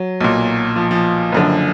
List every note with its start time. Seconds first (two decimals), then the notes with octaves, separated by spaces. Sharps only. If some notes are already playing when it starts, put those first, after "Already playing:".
Already playing: F#3
0.21 B1 A#2
0.76 F3
0.91 F3
1.32 F#1 F#2 D3